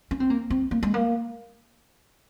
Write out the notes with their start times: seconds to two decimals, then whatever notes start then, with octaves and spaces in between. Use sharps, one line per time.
0.11 C#4
0.20 C4
0.30 A#3
0.50 C4
0.71 A#3
0.83 G#3
0.94 A#3